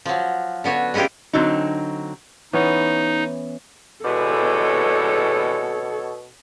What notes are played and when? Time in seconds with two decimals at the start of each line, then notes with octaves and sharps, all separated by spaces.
0.06 F3 F#3
0.64 D3 B3 F#4 C#5
0.94 G#3 C#4 E4 F4 G4
1.33 D3 F#3 C4 D#4
2.53 E3 B3 C#4 D#4
4.05 B2 E3 G3 G#3 A4 C#5